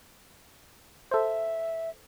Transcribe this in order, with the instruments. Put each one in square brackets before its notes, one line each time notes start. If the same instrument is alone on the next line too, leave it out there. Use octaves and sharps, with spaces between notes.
[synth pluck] A4 C5 [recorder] E5